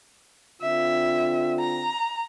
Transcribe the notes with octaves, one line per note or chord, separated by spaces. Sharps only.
D3 C4 F4 E5
A#5